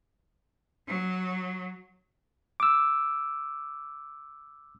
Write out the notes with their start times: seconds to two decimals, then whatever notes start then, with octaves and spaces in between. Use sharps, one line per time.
0.88 F#3
2.60 D6 E6